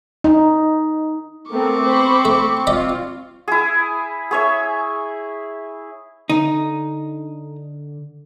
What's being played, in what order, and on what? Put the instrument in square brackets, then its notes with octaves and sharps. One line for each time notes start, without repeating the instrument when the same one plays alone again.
[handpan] D#4
[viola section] A3 B3 A#4 [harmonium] C4 [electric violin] C#6 D6
[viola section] C5 B5
[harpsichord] A3
[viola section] F4 [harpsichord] D5 D#5 B5
[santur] E4 G#4
G#4 C#5 E5
[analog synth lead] D3 [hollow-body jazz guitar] D#4